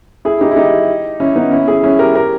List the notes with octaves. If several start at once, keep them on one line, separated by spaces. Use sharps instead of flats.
E4 G#4
D#4 G4
E4
D#4 G4
C#4 E4
B3 D#4
C#4 E4
E4 G#4
C#4 E4
G4 A#4
G4 A#4